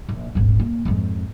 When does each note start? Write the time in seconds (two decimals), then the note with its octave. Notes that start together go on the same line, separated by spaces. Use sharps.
0.09 A#1
0.35 D#1 G#1
0.59 A#3
0.85 F2 G#2